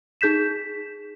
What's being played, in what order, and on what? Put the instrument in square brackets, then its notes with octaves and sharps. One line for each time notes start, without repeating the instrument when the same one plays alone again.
[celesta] D#4 G#4 G6 B6 E7